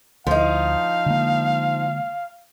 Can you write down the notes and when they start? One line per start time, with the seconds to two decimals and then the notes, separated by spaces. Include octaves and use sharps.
0.27 D2 F3 D#4 F5
1.06 D3 G#3 A#3